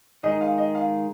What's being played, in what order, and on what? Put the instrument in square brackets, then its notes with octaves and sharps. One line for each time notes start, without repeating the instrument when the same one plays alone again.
[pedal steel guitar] D#3 G#3 D#4 G#4 [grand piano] D#5
[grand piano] F5
D#5
F5